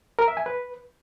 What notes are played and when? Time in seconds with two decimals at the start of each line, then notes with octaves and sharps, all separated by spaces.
0.19 A#4
0.28 E5
0.37 G#5
0.46 B4